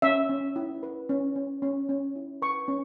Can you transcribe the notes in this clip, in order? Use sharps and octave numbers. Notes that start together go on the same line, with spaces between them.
C#4 E5
C#4
E4
B4
C#4
C#4
C#4
C#4
E4
B4 C#6
C#4